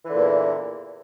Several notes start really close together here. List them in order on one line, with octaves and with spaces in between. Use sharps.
E3 D3 A#2 E2